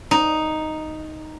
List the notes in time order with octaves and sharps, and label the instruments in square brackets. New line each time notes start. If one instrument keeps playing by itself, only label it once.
[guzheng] D#4